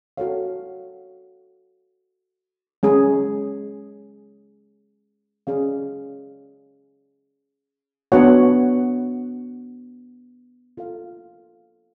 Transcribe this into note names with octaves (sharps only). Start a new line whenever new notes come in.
F#4 A4 C#5 F5
G#3 C#4 G#4
C#4 G#4 D5 F5
B3 D4 F#4 C#5 F#5
F4 A4 F5